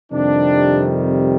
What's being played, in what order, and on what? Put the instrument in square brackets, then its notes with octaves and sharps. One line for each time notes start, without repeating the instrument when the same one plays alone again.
[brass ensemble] F2 C3 D#3 G3 D4